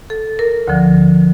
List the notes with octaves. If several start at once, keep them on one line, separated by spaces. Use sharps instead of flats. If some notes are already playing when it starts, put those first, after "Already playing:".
A4
A#4
D2 D3 F3